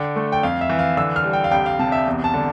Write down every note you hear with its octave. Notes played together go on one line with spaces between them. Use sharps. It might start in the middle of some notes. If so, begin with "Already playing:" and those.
Already playing: D3 G5
A3
G5
F2 F5
E5
E3
F5
D3 E6
F6
G3
G5
F5
C2 G5
F5
C3 A5
E5
E2
A5
D3